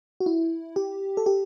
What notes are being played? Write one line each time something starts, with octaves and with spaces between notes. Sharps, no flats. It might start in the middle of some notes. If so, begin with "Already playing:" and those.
F#4
E4
G4
A4
G4